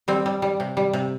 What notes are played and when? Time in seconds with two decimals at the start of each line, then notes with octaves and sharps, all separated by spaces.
0.08 G3 C4
0.26 G3
0.42 G3
0.60 C3
0.77 G3
0.93 C3